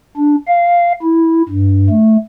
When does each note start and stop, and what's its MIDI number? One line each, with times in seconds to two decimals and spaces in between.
0.17 0.35 62
0.47 0.92 77
1.02 1.42 64
1.49 1.89 43
1.90 2.17 57